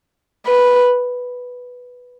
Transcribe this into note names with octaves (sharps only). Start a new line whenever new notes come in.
B4